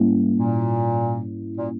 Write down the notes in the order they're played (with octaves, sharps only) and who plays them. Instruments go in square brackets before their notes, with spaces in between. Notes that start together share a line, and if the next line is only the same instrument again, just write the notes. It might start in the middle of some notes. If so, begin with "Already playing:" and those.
Already playing: [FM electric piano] G#2 G3 A#3 C#4 E4
[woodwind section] A#2
A#2